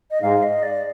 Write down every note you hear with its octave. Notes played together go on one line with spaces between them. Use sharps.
D#5
G#2 F5
D#5
D5